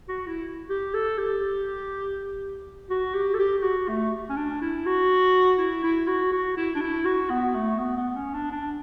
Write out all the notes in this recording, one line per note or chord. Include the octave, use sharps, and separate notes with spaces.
F#4
E4
G4
A4
G4
F#4
G4
A4
G4
F#4
A3
C#4
D4
E4
F#4
E4
E4
F#4
F#4
E4
D4
E4
F#4
B3
A3
B3
B3
C#4
D4
D4